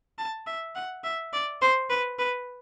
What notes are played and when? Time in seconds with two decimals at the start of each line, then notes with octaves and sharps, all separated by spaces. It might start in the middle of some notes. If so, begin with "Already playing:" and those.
0.19 A5
0.47 E5
0.75 F#5
1.04 E5
1.33 D5
1.62 C5
1.90 B4
2.19 B4